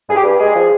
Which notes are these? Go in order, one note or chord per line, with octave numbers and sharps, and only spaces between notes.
G2 G#4
G4
G2
G#3 G#4
F3